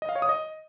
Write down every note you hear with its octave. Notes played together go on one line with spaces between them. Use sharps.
D#5
F5
C#5
D#6
D#5